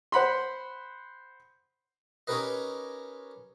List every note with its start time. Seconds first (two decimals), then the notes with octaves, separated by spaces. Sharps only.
0.12 C5 F#5 B5 C6
2.27 C#4 D#4 G4 A#4 B4 D#5